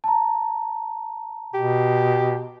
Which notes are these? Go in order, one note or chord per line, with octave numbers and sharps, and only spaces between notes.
A5 A#5
B2 G4